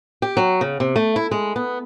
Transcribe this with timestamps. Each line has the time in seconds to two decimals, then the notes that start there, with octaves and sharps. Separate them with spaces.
0.22 G4
0.37 F#3
0.61 C#3
0.80 C3
0.96 A3
1.16 E4
1.31 G#3
1.56 B3